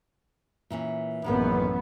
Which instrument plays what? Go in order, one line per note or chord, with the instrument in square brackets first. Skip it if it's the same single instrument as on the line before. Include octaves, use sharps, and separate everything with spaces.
[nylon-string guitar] A#2 E3 C#4
[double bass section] A1 F#2 B3 [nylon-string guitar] D#3 G#3 A#3